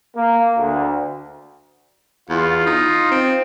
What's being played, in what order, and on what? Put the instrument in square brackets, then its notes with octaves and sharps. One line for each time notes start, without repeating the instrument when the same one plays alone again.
[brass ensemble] A#3
D2
[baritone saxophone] E2 [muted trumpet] F4
[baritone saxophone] D#4
C4